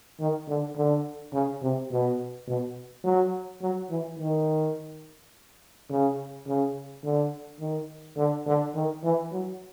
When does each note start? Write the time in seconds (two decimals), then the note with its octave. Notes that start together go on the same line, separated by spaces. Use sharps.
0.20 D#3
0.48 D3
0.77 D3
1.33 C#3
1.62 C3
1.91 B2
2.48 B2
3.04 F#3
3.61 F#3
3.90 E3
4.18 D#3
5.90 C#3
6.46 C#3
7.03 D3
7.60 D#3
8.17 D3
8.46 D3
8.75 D#3
9.03 E3
9.32 F#3